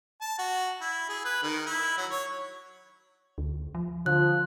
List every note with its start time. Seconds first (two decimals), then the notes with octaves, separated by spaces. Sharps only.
0.21 A5
0.38 F#4
0.81 E4
1.09 G#4
1.25 B4
1.43 D#3
1.66 E4
1.97 F#3
2.11 C#5
3.38 D2
3.75 F3
4.06 D3 F3 F#6